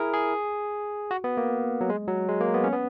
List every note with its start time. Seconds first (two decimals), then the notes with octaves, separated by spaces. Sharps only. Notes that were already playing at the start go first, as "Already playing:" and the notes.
Already playing: E4 G#4 A#4
0.13 G#4
1.11 F#4
1.24 B3
1.37 A#3
1.81 F#3
1.90 G#3
2.08 F#3
2.29 G#3
2.41 A#3
2.54 B3
2.64 C#4
2.73 B3